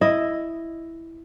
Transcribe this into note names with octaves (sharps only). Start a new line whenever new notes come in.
E4 D#5